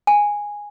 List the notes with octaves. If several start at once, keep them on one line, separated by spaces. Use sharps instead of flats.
G#5